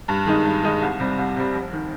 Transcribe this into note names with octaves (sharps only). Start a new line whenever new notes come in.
G2
D#3 G#3 D#4
G2
D#3 G#3 D#4
C2
C3 G3
C2
C3 G3
F1
D#3